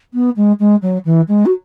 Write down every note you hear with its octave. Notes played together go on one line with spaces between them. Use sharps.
B3
G#3
G#3
F#3
E3
G#3
F#4